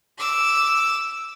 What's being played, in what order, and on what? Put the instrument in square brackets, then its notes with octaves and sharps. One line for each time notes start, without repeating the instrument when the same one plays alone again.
[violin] D6 E6